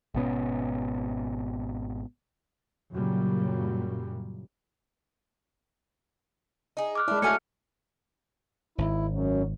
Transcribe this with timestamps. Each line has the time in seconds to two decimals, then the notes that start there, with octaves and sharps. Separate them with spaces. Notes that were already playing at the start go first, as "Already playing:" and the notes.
0.14 G#1 B2 B3 C#4
2.94 F#2 A#2 C#3 F#3 G3
6.77 D#4 G#4
6.95 D6 F6 F#6
7.08 G#3 D4 E4
7.22 F#3 A3 F#4 A4 G#5 F6 C#7
8.78 G#1 E4
9.10 F#2